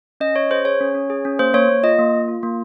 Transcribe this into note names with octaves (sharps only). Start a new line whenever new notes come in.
C#4 D#5
C#4 C#5
G#4 C5
G#4 C#5
C#4
C#4
G#4
C#4
A#3 C5
A#3 C#5
A#3
F4 D#5
A#3
F4
F4
A#3